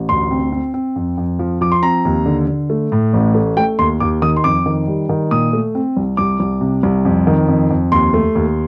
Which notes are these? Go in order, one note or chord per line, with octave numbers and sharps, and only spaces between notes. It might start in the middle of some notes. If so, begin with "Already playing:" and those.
Already playing: A1
D2 C6
C4
C4
C4
F2
F2
F3
F3 D6
C6
C4 A#5
D#2
D3
D3
A3
A2
A1
A3
A3 G5
D#2 C6
D#2 D6
D#3 D#6
C6
F2 D6
D#3
G3
D#3
A#2 D#6
A3
C4
C2
C2 D6
C2
C3
C2
F2
D#3
F2
F2
D#2 C6
A3
D#2